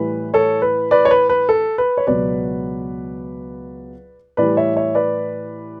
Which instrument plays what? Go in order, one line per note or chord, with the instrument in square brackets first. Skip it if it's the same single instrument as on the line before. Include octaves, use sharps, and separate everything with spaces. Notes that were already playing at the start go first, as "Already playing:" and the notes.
Already playing: [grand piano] A2 E3 G3 B4
A4 C#5
B4
B4 D5
C#5
B4
B4
A4
B4
C#5
C#2 B2 F#3 B4 D5
A2 E3 G3 B4 D5
C#5 E5
C#5 E5
B4 D5